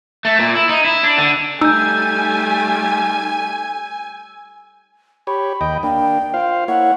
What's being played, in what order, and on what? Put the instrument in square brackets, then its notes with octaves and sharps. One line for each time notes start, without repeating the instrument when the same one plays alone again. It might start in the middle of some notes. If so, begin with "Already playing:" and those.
[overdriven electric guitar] A3
A#2
E4
D#4
E4
D4
D3
[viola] G3 A3 [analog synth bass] D#4 [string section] G#5 [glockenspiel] E6 G6
[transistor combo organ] G4 C#5 [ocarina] B5
[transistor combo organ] D#2 D#5 G5
[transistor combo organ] A#3 D4 [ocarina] G5
[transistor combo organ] F4 C5 F5
[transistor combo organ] A#3 E4 C#5 [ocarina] F#5